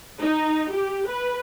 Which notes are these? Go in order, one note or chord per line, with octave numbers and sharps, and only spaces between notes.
D#4
G4
B4